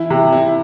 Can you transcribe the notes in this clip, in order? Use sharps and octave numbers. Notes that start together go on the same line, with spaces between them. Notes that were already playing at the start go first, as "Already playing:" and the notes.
Already playing: E3 E4
C3
E4